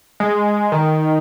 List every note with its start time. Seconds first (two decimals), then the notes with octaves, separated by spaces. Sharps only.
0.20 G#3
0.72 D#3